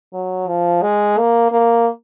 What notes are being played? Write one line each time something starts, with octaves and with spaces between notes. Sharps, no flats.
F#3
F3
G#3
A#3
A#3